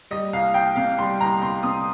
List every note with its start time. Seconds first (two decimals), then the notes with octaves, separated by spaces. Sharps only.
0.11 G3 D#5
0.33 C2 F5
0.54 C2 G5
0.76 C3 F5
0.98 G3 C6
1.21 C2 A#5
1.42 C2 C6
1.63 C3 D#6